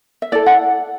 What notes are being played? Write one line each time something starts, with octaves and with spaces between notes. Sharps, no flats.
E5
E4 A4 D5
F#5